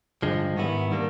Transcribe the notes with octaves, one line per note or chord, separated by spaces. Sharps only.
G2 D3 F3 G#3
G#2 D#3 G3 B3 E4
D#3 G3 A#3 D4